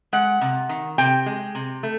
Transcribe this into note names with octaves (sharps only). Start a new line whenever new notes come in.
G#3 F#5
C3
D#3
C3 G5
G#3
C3
A3